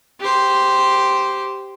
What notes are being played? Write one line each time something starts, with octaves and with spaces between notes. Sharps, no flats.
G4 C5